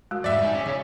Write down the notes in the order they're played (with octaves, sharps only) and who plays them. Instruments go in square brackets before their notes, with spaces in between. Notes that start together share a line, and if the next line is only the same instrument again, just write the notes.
[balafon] G#3 F#4
[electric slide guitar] F2 G#2 G3 [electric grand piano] D5 E5
[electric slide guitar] D#4 G#4
C#4
[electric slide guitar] C#3 G#4 [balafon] C#5